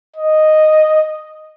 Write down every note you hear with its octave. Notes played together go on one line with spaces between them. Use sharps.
D#5